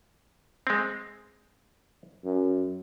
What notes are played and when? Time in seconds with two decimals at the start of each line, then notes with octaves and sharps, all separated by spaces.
0.67 G#3 C4
2.25 F#2